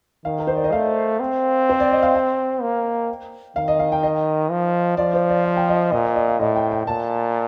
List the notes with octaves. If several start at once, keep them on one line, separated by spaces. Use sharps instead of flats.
D#3 F5
A#4
C5
D5
D#5
A3 F5
C4
C5
D5
D#5
F5
G5
A#3
D#3 F5
D#5
F5
G5
D#5
F3
F3 D5
C5
D5
F5
G5
D#5
A#2 D#5
D5
D#5
F5
A2 D#5
G5
G5
A#2 A5